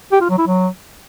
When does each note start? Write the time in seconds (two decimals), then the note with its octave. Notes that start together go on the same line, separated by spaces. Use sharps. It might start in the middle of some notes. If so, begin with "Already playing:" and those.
0.12 G4
0.21 F4
0.30 F#3
0.38 E4
0.47 F#3